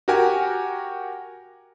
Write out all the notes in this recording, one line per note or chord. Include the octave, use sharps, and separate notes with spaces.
F#4 G4 A#4 F#5 G#5